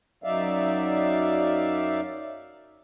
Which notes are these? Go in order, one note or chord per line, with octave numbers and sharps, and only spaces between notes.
F#2 F#3 D#4 D5 E5 F5